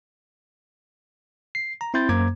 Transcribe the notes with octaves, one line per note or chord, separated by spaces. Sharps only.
C7
A#5
C4 E4 C6 G6 A6
F#2 A#3 C5 A#5 D6 G#6